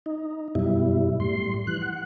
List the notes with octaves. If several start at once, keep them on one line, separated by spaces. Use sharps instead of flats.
D#4
F#2 B2 G3 E4
A2 G3 C6
E3 F#6
F#5